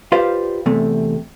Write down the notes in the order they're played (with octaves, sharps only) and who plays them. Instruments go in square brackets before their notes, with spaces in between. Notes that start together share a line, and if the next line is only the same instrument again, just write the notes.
[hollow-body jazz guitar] F4 G4 B4 C5 D5 F5
E2 C3 A3